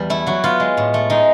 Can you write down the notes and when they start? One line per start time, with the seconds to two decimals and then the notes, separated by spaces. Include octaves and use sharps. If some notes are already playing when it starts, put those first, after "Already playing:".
Already playing: E2 G3 B3
0.10 A3 E4
0.27 F#3 F#4
0.44 B3 F4
0.60 G#3
0.77 A2
0.94 A3
1.10 G#3 D#4